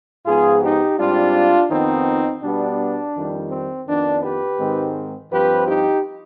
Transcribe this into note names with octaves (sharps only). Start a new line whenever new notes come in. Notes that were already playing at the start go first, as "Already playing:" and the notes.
G#2 F3 B3 F4 G#4
D#4 G4
G#2 G3 C4 D4 F4
F2 D#3 B3 C4 D#4
B2 G3 B3 D4
F2 D#3 G3
C4
F2 D#3 B3 D4
G4 B4
G#2 D#3 G#3 C4
G2 F3 C4 G4 B4
D#4 G4